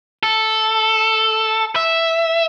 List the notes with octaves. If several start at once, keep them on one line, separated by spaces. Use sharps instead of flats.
A4
E5